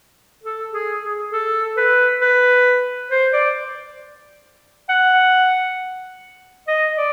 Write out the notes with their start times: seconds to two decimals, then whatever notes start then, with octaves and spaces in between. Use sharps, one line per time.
0.43 A4
0.72 G#4
1.02 G#4
1.32 A4
1.77 B4
2.21 B4
3.11 C5
3.33 D5
4.89 F#5
6.67 D#5
6.98 D5